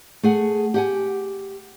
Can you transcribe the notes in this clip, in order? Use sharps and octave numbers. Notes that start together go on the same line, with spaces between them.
A3 G#4 F#5
G4 F#5 G#5